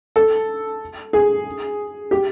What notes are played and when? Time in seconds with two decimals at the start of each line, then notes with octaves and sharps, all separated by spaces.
0.16 A4
1.13 G#4
2.11 G4